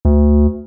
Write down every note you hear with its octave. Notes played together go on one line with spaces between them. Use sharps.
D2